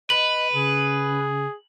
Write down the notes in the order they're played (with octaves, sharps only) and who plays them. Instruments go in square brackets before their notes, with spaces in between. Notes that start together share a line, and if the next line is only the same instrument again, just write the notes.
[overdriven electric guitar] B4 [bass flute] D#5 [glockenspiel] F#7
[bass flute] C#3 [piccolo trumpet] G#4